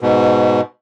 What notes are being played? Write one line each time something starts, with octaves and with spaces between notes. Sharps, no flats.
G#2 B2